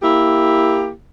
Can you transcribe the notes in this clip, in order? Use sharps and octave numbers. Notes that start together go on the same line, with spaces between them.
A#3 E4 G4